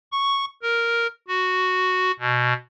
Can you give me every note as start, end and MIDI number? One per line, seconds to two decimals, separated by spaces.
0.12 0.45 85
0.62 1.07 70
1.28 2.11 66
2.19 2.53 47